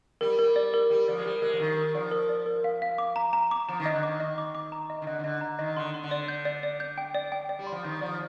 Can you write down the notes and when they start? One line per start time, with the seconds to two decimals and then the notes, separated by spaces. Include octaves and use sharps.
0.21 G3 A#4
0.39 A#4
0.56 D5
0.74 A#4
0.90 G3 A#4
1.08 F3 D5
1.18 G#3
1.25 G3 A#4
1.42 G#3 A#4
1.53 F3
1.60 D#3 A#4
1.77 A#4
1.95 F3 D5
2.11 A#4
2.29 D5
2.46 A#4
2.64 F5
2.82 F5
2.98 D6
3.16 A#5
3.33 A#5
3.51 D6
3.69 F3 A#5
3.80 D#3
3.86 D#5
3.91 D3
4.03 D#3 D6
4.20 D#5
4.38 D6
4.55 D6
4.72 A#5
4.90 D#5
5.02 D#3
5.07 D3 D#5
5.19 D#3
5.24 D3 D#5
5.41 A#5
5.59 D#3 D#5
5.76 D3 C6
5.94 C6
6.04 D3
6.11 D5
6.28 G6
6.45 D5
6.63 D5
6.80 G6
6.98 G5
7.15 D5
7.32 G5
7.49 D5
7.59 G3
7.67 C6
7.72 F3
7.84 D#3 G6
8.01 F3 D5